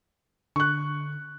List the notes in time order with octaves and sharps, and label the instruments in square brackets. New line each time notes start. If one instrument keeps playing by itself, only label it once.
[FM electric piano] D3 [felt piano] C#6 F#6